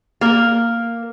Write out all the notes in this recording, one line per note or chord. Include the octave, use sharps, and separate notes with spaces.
A#3 A#4